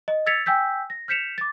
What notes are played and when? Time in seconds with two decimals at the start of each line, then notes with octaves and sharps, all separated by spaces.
0.08 D#5
0.26 E6 G#6 A6 B6 C#7 F7
0.46 G5 G#5 E6 G6 B6
0.90 A#6
1.08 F6 G6 B6 C#7 E7 F7
1.38 D6 A6